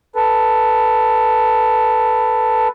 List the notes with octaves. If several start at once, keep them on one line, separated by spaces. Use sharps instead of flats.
A4 B4